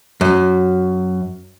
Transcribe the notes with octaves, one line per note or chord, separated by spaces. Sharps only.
F#2